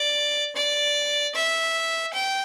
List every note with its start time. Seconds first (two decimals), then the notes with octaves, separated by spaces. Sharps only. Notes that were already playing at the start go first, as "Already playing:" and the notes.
Already playing: D5
0.56 D5
1.35 E5
2.13 G5